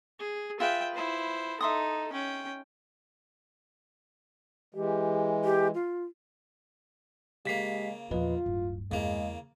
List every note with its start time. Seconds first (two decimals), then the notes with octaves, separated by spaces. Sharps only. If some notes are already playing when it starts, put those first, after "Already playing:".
0.19 G#4
0.60 F4 G#4 B4 E5 G5
0.95 E4 C5
1.61 D#4 A4 E5 C6 D#6
2.12 C#4 G5
4.75 E3 G#3 G4
5.44 G4
5.74 F4
7.46 C#3 G#3 A#3 G4 B6 C7
8.11 E2 A#2 F3 F4 B4 D#5
8.46 D1 G2
8.92 E2 C#3 G#3 A#3